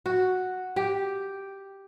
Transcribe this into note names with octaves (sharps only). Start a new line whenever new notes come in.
F#4
G4